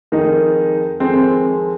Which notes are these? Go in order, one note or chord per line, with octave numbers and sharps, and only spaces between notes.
F2 D#3 G#3 D#4
F2 D#3 G#3 C4